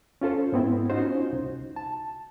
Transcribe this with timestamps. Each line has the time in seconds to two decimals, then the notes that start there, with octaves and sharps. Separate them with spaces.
0.21 C#4 F4 A4 C5
0.52 G#2 B3 C4 E4
0.90 C#4 D#4 F4 F#4 C5
1.32 C2
1.76 A5